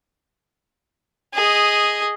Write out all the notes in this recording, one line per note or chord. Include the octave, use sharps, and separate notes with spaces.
G#4 D#5